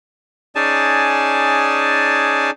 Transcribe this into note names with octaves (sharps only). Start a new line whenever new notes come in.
C#4 D#4 G#4 D5 G#5 A5